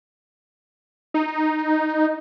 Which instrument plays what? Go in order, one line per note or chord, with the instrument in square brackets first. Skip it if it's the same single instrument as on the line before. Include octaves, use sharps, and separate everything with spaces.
[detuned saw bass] D#4